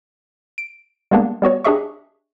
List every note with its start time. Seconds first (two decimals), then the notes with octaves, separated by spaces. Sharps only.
0.58 D7
1.11 G3 G#3 A#3 B3 D4
1.42 G3 B3 F#4 C#5
1.64 D4 G4 G#4 D#5 E5 C#6